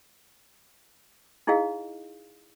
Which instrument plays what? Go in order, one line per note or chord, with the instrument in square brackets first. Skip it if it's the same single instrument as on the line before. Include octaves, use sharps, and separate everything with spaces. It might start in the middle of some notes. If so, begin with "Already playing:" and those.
[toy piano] D#4 E4 G#4 D#5 F5